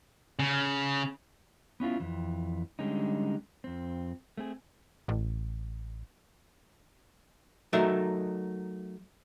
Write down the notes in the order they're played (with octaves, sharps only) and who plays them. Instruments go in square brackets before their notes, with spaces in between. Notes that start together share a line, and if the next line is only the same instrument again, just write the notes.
[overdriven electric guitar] C#3
[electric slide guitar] B3 C#4 E4 F4
F2 E3
D3 G3 G#3 C#4 D#4
F2 C4
A3 C4 G#4
[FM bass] A1
[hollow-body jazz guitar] F#3 A3 D#4 A#4 E5